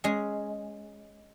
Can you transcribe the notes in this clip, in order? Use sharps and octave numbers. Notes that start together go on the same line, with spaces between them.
G#3 C#4 G#4